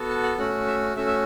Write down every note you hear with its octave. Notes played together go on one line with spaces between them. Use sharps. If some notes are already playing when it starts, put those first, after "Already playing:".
Already playing: B3 F#4 A4
A5
F#5
A3 C#4 F#4 F#5
E5
A3 C#4 F#4 E5
E5